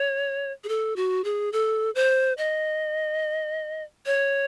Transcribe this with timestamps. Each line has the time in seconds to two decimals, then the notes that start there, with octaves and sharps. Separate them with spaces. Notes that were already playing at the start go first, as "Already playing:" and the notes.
Already playing: C#5
0.64 G#4
0.69 A4
0.96 F#4
1.24 G#4
1.53 A4
1.95 C5
2.38 D#5
4.06 C#5